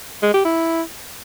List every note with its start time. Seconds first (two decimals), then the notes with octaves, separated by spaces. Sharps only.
0.23 G#3
0.34 G4
0.45 E4